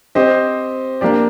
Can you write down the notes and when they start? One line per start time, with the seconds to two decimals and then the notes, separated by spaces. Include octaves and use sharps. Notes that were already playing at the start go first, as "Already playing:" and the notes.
0.15 C4 G4 C5 D#5
1.01 A#3 D4 G4 D5